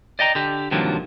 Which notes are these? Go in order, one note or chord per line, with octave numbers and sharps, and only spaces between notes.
D5 D#5 G5 A#5
D3 G4
G2 C3 D#3 F3 F#3 A#3